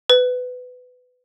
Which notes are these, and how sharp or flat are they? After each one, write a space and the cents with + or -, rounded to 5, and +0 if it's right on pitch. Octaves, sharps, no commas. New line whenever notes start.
B4 +20